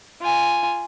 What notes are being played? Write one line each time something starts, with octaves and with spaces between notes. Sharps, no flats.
F4 G#5